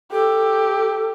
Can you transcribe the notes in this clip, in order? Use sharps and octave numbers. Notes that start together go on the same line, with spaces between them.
G4 A4